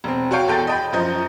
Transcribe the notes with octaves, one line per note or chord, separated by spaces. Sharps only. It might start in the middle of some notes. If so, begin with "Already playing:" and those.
E1 C4
F#4 C#5 F5 G5
E2 A4 G5 G6 A6
D#5 G5 B5
F#2 F3 D#5 G6